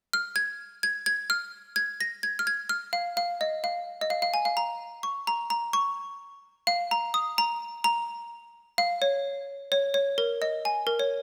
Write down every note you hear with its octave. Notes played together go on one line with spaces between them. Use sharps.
F6
G#6
G#6
G#6
F6
G#6
A#6
G#6
F6
G#6
F6
F5
F5
D#5
F5
D#5
F5
F5
G#5
F5
A#5
C#6
A#5
A#5
C#6
F5
A#5
D#6
A#5
A#5
F5
C#5
C#5
C#5
A#4
D#5
G#5
A#4
C#5